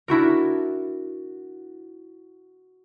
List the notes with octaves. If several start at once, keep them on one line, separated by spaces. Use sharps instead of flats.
D4 E4 F#4 A#4